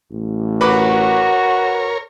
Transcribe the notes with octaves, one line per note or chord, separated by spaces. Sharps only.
A1
F#4 A#4 B4 C#5 B5 D6